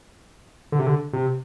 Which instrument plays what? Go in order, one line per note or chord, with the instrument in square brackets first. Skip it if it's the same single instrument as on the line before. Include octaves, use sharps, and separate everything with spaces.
[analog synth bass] D3
C3
D3
C3